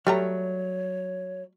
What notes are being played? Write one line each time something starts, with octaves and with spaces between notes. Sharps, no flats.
F#3 G3 A3 C#5 A#5